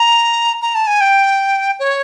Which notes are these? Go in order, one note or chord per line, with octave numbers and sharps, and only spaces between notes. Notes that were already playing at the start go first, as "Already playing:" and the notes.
Already playing: A#5
A#5
A5
G#5
G5
C#5